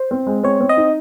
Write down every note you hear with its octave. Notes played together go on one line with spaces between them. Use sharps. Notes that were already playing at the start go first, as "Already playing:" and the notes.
Already playing: C5
C4
G#3
C4 C#5
C4
D#5
D#4